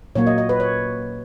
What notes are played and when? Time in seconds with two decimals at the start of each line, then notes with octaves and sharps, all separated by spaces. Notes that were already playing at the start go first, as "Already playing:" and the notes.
0.15 A#2 F#3 A#3 C#5
0.27 D#5
0.38 D#5
0.49 B4
0.60 C#5